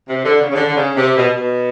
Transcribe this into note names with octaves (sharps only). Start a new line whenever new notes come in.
C3
D3
C#3
C#3
D3
D3
C#3
C3
B2
B2